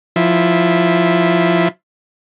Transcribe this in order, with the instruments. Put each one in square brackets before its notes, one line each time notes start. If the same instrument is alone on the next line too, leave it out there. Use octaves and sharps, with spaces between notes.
[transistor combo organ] F3 E4